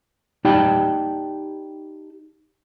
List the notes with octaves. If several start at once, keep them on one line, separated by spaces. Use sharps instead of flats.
D#4 G4 D5 G5 A5 B5